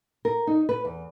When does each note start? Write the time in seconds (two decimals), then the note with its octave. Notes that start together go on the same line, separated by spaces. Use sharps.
0.25 A#4
0.47 D#4
0.69 B4
0.85 E2